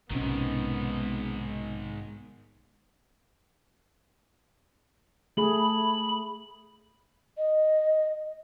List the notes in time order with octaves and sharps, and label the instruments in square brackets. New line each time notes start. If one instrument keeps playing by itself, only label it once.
[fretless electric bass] B1 C3 C#4 [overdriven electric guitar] G#2 D#3 [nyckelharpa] B3
[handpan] A3 G#4 [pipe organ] B5
[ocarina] D#5